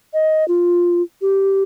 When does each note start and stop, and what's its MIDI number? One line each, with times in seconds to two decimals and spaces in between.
0.14 0.47 75
0.48 1.02 65
1.22 1.63 67